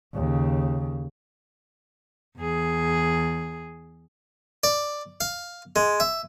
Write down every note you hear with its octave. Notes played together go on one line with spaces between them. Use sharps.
D#2 C#3
E2 G#4
D5
F5
G#3
E5